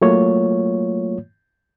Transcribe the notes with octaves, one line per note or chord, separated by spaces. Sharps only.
F#3 A3 A#3 F4 C#5